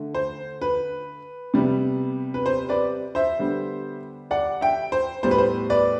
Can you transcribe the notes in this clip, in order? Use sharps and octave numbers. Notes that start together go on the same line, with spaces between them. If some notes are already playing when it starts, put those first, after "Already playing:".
Already playing: D3 A3
C5
B4
C3 G3 B3
B4
C5
B4 D5
C5 E5
D3 G3 B3
D5 F#5
E5 G5
C5
A2 G3 B3 C5
B4
C5
B4 D5